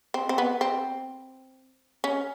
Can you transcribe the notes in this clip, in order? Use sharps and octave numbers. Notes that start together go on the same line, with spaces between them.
C4
C4
B3
C4
C#4